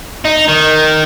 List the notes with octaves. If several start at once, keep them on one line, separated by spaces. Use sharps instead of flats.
D#4
D#3